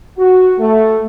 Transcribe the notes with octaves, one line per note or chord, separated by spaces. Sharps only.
F#4
A3